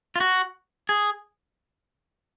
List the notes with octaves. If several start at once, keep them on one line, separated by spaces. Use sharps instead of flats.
F4
F#4
G#4